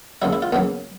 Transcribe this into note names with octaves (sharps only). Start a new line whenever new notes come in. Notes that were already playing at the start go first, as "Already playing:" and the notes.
D#2 C#3 F#3 E4
E4
F4
D#2 C#3 F#3 B3